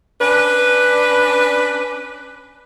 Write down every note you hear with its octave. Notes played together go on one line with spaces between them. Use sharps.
C#4 D4 B4